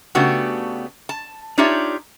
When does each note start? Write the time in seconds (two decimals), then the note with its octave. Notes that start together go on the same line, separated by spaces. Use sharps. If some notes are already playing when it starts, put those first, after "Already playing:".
0.15 C#3 A3 B3 D4 F#4 G4
1.09 A5
1.58 D4 D#4 F4 G4 C#5 E5